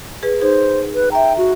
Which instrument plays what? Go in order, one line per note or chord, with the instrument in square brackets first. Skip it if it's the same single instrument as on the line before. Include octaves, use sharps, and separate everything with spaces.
[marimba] G#4 B4
[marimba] D#4 G#4 [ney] C5
[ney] B4
[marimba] E5 A#5 [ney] G5
[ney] F#4